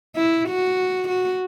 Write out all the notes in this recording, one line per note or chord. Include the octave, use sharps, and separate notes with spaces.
E4
F#4
F#4